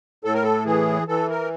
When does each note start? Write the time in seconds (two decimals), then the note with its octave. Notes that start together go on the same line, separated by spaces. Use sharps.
0.25 A2 A4
0.34 A#4
0.43 A4
0.66 E3 G#4
1.08 E3 A4
1.30 A#4